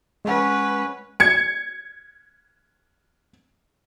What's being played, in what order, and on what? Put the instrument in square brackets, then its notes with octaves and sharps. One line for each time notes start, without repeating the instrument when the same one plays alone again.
[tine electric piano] G#3 F#5 [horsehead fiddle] C#4 B4
[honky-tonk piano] G#6 C#7